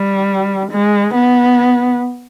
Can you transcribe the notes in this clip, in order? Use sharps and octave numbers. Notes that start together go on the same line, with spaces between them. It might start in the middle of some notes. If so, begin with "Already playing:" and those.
Already playing: G3
G#3
B3